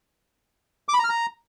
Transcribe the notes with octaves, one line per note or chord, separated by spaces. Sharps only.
D6
B5
A#5
F6
A#5